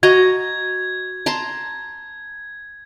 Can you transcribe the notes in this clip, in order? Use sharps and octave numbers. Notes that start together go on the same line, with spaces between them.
F#4 D#5 A#5 G#6
A5 A#5 C6